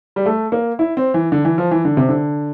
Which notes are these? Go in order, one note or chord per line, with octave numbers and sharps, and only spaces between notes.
G3
A3
A#3
E4
C4
E3
D3
E3
F3
E3
D3
C3
D3